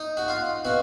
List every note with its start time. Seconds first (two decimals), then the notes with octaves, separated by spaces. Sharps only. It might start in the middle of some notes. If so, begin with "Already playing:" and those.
Already playing: D#4
0.17 F#4
0.28 F4
0.65 B2 F#4